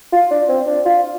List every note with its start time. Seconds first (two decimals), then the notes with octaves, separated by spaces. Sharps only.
0.13 F4
0.31 D4
0.49 C4
0.67 D4
0.85 F4